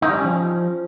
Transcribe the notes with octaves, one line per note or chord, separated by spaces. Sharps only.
D#4
G3
C#4
F3